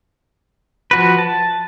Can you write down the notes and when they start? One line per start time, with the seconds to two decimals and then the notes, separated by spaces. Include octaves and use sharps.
0.91 F3 F#4 B4
1.18 A5